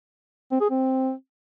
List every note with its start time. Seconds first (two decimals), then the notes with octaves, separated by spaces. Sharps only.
0.51 C4
0.61 G#4
0.70 C4